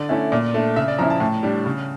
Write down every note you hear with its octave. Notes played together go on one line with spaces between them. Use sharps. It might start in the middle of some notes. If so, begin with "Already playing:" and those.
Already playing: D3 D5
A3 C#4 E4
A#2
A3 D4
C#3 E5
D5
F3 C#4 E4 A#5
A5
A2
G3 D4
C#3